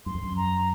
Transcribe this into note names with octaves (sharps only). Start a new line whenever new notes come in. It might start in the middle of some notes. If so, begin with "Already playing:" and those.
F#2 C6
F2
F#2
A#5